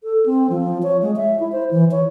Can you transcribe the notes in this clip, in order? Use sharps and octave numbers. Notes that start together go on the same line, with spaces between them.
A4
C4
F3
C#5
G#3
E5
E4
C5
E3
C#5